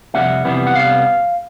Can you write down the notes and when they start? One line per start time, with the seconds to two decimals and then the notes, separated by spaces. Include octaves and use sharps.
0.14 F2 C3 E3 G3 B3 E5 F#5
0.45 F2 C3 E3 G3 B3
0.67 F#5
0.75 C3 G3 B3 F5